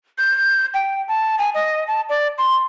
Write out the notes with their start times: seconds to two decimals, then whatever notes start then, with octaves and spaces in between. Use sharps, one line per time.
0.18 G6
0.74 G5
1.08 A5
1.39 G#5
1.54 D#5
1.87 A5
2.09 D5
2.38 C6